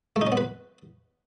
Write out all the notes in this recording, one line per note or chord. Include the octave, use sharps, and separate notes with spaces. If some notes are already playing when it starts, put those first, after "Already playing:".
A3
D#4
C#4
B3
B4